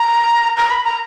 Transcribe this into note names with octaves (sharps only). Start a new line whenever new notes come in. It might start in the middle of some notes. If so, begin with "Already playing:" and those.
Already playing: A#5
A#5
B5
A#5